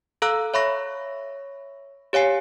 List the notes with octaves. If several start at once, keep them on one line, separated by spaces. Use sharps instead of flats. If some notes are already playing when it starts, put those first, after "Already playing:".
A4 F5 A#5 E6 F#6
C#5 E5 B5 C#6 A#6
G4 C#5 F5 G#5 C7